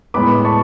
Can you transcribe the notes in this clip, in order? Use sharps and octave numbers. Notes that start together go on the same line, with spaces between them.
A2 G#3 B3 B5 D6
A5 C#6